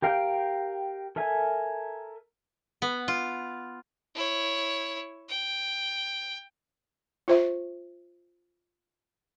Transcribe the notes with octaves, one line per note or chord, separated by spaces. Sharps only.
G4 A#4 F5 G5
A4 A#4 E5 G#5
B3
F4
E4 C#5
G5
F4 C5 E5